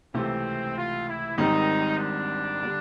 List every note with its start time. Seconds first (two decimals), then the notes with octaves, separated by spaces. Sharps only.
0.14 C#2 C3 E3 A3 C4
0.76 F4
1.07 E4
1.37 G#1 G#2 D#3 G3 C4 D#4
1.98 D4
2.63 D3 G3